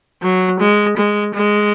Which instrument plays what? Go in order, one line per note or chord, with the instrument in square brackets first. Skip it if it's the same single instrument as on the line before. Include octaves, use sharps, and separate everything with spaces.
[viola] F#3
G#3
G#3
G#3